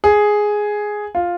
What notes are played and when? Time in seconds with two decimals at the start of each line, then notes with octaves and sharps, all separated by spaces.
0.04 G#4
1.15 F4